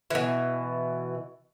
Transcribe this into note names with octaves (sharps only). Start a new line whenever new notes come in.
B2 E3